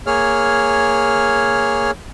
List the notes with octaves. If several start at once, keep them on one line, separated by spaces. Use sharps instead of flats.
A#3 G#4 C#5 F6